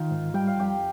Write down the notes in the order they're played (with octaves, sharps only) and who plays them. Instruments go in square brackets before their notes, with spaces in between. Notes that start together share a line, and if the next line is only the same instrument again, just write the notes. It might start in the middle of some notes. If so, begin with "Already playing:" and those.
Already playing: [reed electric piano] D#3 [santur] D#4 F4
[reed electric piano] G#2
[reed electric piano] G3 [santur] G5
[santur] F5
[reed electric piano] F2 [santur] G4 G5